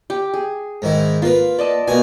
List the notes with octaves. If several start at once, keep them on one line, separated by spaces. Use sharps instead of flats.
G4
G#4
G#2 D#3 E4
A#3 F4 B4
D5 D#5 A5
B2 A#3 G#5